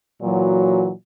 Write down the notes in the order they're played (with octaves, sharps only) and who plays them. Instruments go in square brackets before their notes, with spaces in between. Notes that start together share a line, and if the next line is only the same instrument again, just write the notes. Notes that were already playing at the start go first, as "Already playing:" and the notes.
[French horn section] A#2 E3 F#3